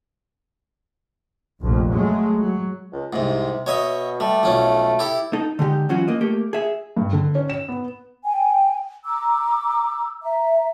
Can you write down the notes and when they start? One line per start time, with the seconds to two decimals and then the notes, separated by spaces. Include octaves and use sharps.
1.61 F1 A#1 F2
1.91 F#3 G#3 A3
2.40 F#3
2.93 C#2
3.13 C2 G#2 C3
3.66 B2 C#5 D#5 E5
4.20 G3 A3
4.43 B1 F2 C#4
4.99 E4 G4 A4
5.33 D#4 A4
5.59 D3 G#3 D#4 G4
5.89 E3 F#3 C#4 F4 F#4
6.08 A#3 D#5
6.21 A3 A#3 G4
6.53 G#4 E5
6.97 G2
7.13 D3
7.35 C#4
7.50 E7
7.68 B3
8.24 G5 G#5
9.04 A#5 D6 E6
10.23 E5 A#5